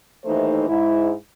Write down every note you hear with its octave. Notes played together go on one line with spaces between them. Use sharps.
D#2 E3 A3 D#4 C5
G#2 E4